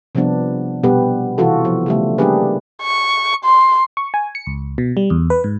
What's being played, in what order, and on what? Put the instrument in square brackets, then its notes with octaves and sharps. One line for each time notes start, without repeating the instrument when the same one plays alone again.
[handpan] C3 F3 G3 B3 D4
B2 G3 B3 G4 B4
C3 E3 F4 F#4 A4
F3
C#3 G3 A3
G3 A#3 D4 G4 G#4 B4
[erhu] C#6
C6
[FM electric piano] C#6
G#5
C#7
C#2
B2
G3
E2
B4
G#2